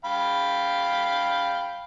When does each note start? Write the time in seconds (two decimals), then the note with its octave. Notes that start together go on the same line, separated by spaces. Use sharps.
0.05 F5 G5 B5